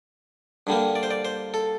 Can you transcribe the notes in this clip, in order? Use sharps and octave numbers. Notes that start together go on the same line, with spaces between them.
G2 D3 G3 A#3
D5
C5
D5
C5
A4